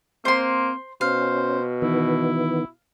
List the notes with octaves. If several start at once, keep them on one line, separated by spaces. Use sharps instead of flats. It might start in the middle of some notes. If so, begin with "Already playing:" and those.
A#3 C4 C5 C6
B2 C#4 C5 F5
D#3 E3 B3 E4